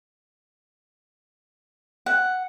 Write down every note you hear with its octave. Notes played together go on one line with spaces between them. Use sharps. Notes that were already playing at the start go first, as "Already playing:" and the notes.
F#5